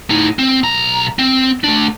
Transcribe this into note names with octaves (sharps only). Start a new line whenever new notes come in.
A2 D#4
C4
B1 A#5
C4
A3 D4